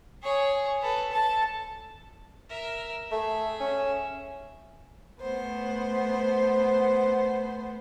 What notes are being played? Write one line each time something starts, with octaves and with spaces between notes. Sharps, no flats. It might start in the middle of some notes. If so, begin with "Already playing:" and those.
G#4 C#5
A4 B4
A4 A5
A#4 E5
A3 G#4 E5
C#4
A3 B3 C5